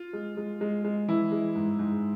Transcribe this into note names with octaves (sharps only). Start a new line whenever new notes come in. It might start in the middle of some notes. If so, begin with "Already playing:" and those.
Already playing: F4
G#3
G#3
G#3
G#3
E3 E4
G#3
G#2
G#2